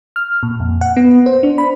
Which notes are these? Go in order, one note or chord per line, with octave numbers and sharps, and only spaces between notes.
F6
A#2
F2
F#5
B3
C5
D4
B5